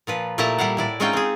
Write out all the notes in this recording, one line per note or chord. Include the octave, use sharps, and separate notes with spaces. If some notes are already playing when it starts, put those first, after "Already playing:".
A#2 F3 B4
A#2 A3 E4 G4 A5 A#5
G3 E4 F5 F#5
A2 E4 D5
G#3 C4 C#4 D#4 F4 G5
C4 G#4